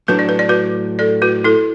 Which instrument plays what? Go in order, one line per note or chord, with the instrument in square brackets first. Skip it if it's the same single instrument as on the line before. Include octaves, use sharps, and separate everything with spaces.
[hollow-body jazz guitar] A2 F#3 D4 [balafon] B4
[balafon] D5
B4
D5
F#4 B4
A4 D5
F#4 B4
E4 A4